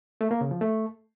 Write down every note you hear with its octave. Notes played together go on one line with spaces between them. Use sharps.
A3
A#3
C#3
F3
A3